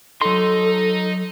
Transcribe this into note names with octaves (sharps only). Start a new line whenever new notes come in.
F#3 D#4 A4 C6